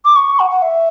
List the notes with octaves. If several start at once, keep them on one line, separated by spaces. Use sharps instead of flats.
D6
C#6
F#5
F#5
E5